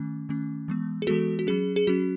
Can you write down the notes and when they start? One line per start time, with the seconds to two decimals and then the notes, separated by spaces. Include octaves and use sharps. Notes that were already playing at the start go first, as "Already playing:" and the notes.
Already playing: D#3 A3 C#4
0.29 D#3 A3 C#4
0.68 E3 G#3 B3
1.02 G#4
1.07 E3 G#3 B3 F#4 A4
1.39 F#4
1.47 F#3 C#4 G#4
1.76 G#4
1.87 F#3 C#4 F#4